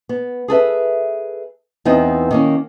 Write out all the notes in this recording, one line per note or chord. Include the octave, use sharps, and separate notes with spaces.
B3
G#4 A4 B4 E5
E2 B3 C4 D#4
D#3 A#3 C#4